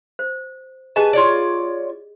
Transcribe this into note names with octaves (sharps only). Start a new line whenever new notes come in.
C5
G4 G#4 B4 D#5 G#5 A5
F4 C#5 D5